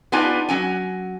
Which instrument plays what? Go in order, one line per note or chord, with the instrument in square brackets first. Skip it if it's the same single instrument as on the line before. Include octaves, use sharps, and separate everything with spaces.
[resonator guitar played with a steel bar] B3 D4 D#4 F4 G4 G#5
F#3 C#4 G#5